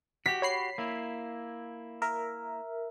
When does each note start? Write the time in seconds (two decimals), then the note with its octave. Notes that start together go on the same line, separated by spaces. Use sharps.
0.26 F#4 G4 B6
0.42 C#5 B5 C7
0.78 A#3 E4
2.02 A#4 E5